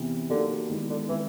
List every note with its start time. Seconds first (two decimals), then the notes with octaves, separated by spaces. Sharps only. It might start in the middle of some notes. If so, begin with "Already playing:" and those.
Already playing: E2 C3 E3
0.30 D3 F#3 A#3 D#4 G4
0.70 D#3 G#3 B3 E4
0.90 D3
1.09 D#3 E3 G#3 C4 D#4